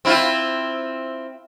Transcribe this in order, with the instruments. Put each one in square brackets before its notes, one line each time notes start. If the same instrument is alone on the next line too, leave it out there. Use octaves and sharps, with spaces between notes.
[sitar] C4 E4 F4